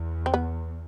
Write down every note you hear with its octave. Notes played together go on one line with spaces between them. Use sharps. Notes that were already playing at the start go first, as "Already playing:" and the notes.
Already playing: E2
C4
B3